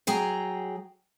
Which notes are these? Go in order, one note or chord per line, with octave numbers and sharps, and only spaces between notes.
F#3 G#4 G5 A#5